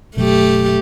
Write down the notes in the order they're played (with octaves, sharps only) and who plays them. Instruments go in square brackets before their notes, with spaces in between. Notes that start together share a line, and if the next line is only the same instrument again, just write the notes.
[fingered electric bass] F#1 B2 F#3 [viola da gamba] A3 G4